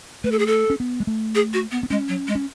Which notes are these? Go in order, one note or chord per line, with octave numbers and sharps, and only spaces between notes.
A3 B4
A4
G#4
A4
C#4
B3
G#3
A3
G#4
F#4
B3
B3
G#3 C#4
F#3
G#3
C#4